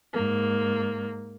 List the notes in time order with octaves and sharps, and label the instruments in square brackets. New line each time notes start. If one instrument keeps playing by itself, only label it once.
[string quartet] G#2 A#3